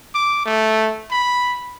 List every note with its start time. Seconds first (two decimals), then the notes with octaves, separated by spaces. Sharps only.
0.14 D6
0.46 A3
1.11 B5